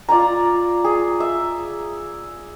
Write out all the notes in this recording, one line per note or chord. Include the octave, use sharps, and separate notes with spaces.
F4 D5 G#5 A#5
G#4
E5